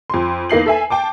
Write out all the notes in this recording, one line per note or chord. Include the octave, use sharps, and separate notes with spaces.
F2 C6
E2 A#3 D#4 C7 F#7
A4 E5 G#5
G5 A5 D6